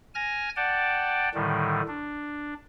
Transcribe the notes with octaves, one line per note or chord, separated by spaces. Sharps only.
G#5 F6 G#6 A#6
D5 F#5 G5 A5
A2 D3 D#3 G3
D4